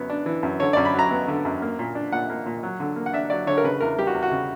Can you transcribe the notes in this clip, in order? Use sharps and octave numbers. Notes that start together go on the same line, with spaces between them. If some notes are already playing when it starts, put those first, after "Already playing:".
Already playing: F#2 B3
D4
E3
F#2
D3 C#5
F#2 D5
B5
F#3 A#5
B3
D3
F#2
A#3
A#2
D4
A#2 F#5
A#3
A#2
F#3
D3
A#3
F#5
D4 E5
F#3 D5
D3 C#5
A#4
C#3 B4
E2 A#4
G3 G4
F#4
E2
F#4
C#3